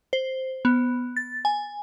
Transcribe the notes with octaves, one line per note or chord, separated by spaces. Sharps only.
C5
B3
A6
G#5